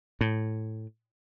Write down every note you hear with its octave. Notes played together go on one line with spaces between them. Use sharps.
A2